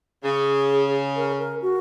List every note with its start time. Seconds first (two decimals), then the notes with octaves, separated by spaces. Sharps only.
0.23 C#3 G#4
1.16 A#4
1.39 A#4
1.62 F#4